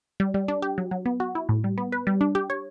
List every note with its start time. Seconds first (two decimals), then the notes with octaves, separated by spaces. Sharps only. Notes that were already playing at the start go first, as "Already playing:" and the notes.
0.20 G3
0.34 G3
0.48 D4
0.62 G4
0.78 F#3
0.91 F#3
1.06 B3
1.20 F#4
1.35 E4
1.49 A2
1.64 G3
1.78 B3
1.92 B4
2.07 G3
2.21 D4
2.35 G4
2.50 C#5